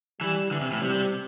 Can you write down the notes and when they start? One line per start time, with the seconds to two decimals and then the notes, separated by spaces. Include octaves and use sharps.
0.21 E3 G3
0.51 D3 E3
0.62 C3
0.72 A2
0.82 C3 G3